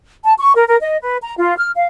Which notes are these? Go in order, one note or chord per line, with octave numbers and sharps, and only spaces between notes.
A5
C#6
A#4
A#4
D#5
B4
A#5
F4
F6
F5